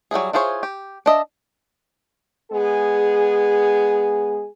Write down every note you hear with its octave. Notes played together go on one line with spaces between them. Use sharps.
F#3 G3 E4 G#4
E4 F4 G#4 C5 C#5
G4
D4 D#5 E5
G#3 B3 G#4